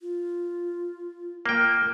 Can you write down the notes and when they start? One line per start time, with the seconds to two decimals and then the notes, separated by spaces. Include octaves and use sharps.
0.01 F4
1.46 A#3 G5